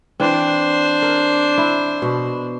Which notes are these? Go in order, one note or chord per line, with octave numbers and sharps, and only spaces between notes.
E3 C4 D4 C5
A#4
E4
B2